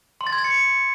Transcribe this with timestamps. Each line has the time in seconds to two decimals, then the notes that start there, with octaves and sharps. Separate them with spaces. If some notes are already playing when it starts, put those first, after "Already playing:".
0.21 C6
0.27 A6
0.33 G#6
0.38 A6
0.44 C#7